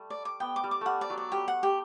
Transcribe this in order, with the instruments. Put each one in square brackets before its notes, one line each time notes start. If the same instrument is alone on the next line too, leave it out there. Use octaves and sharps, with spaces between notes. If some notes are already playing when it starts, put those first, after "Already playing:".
Already playing: [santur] G3 A3
[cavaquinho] D5
D6
[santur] B3 [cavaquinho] G5
[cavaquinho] D6
[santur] G3
[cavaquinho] D6
[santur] G3 A3 [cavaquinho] F#5
[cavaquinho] D5
[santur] F#3
[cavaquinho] D5
[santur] G3 [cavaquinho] G4
[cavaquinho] F#5
G4